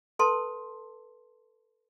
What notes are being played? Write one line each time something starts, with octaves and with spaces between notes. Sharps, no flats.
A4 B4 A5 C6